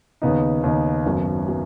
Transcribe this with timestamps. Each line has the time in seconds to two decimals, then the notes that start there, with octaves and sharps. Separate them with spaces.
0.22 D#2 C#3 B3 D#4
0.63 D#2 C#3 B3 D#4
1.05 G#1 F#2 F#3 B3
1.46 F#3 B3